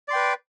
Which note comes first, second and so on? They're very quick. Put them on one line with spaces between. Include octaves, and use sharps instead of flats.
D5 C6 G5 B4